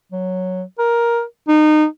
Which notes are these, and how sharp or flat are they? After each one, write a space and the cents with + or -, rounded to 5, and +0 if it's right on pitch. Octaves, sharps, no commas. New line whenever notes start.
F#3 -5
A#4 +10
D#4 -25